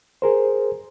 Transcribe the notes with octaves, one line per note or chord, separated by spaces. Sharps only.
G#4 A#4 C5